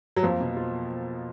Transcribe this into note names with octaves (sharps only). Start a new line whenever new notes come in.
F#3
F2 F3 A#3
B2
F4